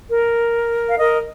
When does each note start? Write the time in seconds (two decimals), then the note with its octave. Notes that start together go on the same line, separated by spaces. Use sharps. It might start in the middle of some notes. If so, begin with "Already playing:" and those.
0.11 A#4
0.87 F5
0.99 A#4 D#5